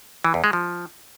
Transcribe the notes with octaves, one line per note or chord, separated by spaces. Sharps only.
E3
E2
G#3
F3